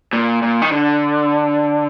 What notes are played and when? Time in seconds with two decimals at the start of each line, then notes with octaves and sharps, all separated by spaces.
0.13 A#2
0.43 A#2
0.62 D#3
0.72 D3